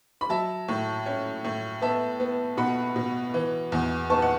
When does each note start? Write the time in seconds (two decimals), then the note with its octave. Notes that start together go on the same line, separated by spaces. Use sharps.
0.21 B5
0.29 F#3 E5 A5
0.68 A2
1.06 C#4
1.44 A2
1.82 B3 E5 A5
2.20 B3
2.57 B2 F#5 B5
2.96 B2
3.34 E3
3.72 E2
4.10 B3 A5 C#6
4.22 F#5